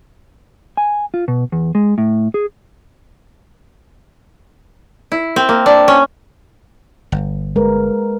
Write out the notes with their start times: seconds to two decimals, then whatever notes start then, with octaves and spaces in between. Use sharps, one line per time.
0.77 G#5
1.14 F4
1.28 B2
1.52 E2
1.75 G#3
1.98 A2
2.34 G#4
5.12 E4
5.36 C4
5.49 A#3
5.66 D4
5.88 C#4
7.12 G1
7.56 G#3 A#4 B4